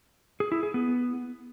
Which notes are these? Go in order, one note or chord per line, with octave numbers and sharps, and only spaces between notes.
G#4
E4
G#4
B3